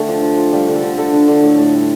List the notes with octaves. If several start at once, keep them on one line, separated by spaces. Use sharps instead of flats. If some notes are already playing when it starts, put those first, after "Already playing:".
Already playing: D3 A3 G5
F3
F3
F3
G3 F5
D3
A4
D3
D3 A4
D3
D3
A2
A2
G3